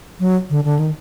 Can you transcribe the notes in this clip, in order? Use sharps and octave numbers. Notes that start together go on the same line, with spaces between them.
F#3
D3
D3
D#3